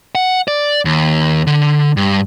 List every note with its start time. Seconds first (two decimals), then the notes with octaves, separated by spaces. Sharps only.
0.15 F#5
0.48 D5
0.85 D#2
1.47 D3
1.97 G2